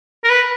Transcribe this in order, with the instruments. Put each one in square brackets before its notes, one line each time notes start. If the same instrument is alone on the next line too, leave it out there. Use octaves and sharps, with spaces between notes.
[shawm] A#4
B4